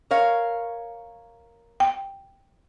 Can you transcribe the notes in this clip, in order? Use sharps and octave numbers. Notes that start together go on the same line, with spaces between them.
A#4 C#5 F5
G5